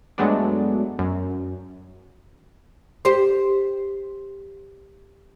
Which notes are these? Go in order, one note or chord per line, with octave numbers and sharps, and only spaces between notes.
G2 F#3 G#3 A3 B3 D4
F#2
G4 C5